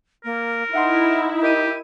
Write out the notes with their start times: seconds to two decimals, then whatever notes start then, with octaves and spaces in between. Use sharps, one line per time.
0.25 A#3 A#4
0.73 D#4 E4 E5 F#5 C6
1.42 G4 A#4 D#5 D#7